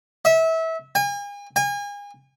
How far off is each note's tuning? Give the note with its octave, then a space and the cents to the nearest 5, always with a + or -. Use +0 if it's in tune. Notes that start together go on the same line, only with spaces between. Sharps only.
E5 -25
G#5 -40
G#5 -35